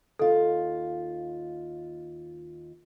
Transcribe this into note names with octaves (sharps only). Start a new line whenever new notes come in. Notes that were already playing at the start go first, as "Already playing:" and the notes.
D#2 F4 A4